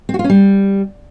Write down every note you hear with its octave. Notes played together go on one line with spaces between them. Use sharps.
C4
F#4
F4
C#4
G3